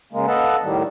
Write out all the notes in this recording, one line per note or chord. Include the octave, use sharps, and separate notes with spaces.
C#3 G#3 A#3
A4 B4 D#5 F5 F#5 A5
A2 D#3 G3